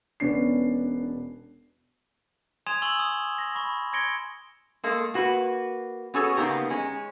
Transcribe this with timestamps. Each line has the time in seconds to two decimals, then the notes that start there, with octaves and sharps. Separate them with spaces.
0.20 E1 B3 C#4 D4 C7
2.67 G#5 C6 D#6 G#6 E7 F7
2.82 G#5 C#6 E6 F#7 G7
2.99 D#6
3.38 A#6
3.55 B5 C#6
3.93 C6 G#6 A#6 C#7 D7 G7
4.84 G#3 A#3 A4
5.14 A#3 F#4 B4
6.14 B3 C#4 F#4 G#4 A4 C#5
6.37 C#3 A#3 B3 D#4 G4 A#5
6.70 G#3 C#4